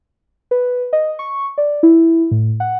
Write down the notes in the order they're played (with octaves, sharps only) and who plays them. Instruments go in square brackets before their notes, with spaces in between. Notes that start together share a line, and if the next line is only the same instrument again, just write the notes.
[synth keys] B4
D#5
C#6
D5
E4
A2
F#5